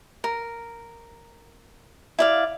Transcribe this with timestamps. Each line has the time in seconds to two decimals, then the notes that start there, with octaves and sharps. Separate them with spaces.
0.24 A#4
2.19 E4 D5 F5